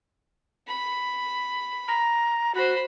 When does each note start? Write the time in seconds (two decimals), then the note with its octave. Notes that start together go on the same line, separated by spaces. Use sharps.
0.67 B5
1.88 A#5
2.55 F#4 C5 B5